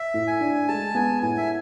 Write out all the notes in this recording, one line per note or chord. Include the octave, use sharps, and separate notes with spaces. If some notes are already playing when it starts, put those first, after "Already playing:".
Already playing: E5
A2
G#5
D4
G#3 A5
B3 G#5
A2 G#5
E5